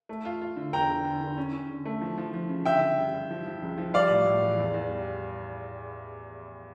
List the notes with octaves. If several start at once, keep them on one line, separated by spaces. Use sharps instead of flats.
A3
F4
F4
D3
E2 G5 A#5
D3
D3
D3
C#4
C#4
D3
A3
F3
F3
F3
C#3
D3 E5 G5
D3
G2
G2
F3
F3
C#2
F3
G3 D5 F5
A2
A2
E3
E2
E2
G3